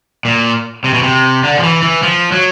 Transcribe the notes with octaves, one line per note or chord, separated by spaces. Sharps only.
A#2
C3
B2
C3
D3
F3
E3
E3
F3
F#3